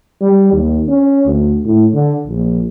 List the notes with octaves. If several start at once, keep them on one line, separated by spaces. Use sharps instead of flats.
G3
D#2
C#4
D2
A2
D3
A#1